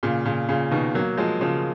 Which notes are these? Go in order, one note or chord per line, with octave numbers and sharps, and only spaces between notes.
A#2 C#3
A#2 C#3
A#2 C#3
B2 D#3
F#3 A#3
F3 G#3
C#3 F3